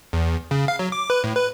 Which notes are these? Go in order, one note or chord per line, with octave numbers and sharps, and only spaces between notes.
E2
C#3
F5
F#3
D6
B4
A2
B4